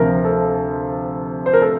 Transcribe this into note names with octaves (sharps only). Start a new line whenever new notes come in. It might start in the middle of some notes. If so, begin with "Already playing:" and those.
Already playing: D2 C3 F3 A#4
A4
C5
A#4
A4